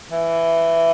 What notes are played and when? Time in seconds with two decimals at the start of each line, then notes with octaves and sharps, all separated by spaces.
0.12 E3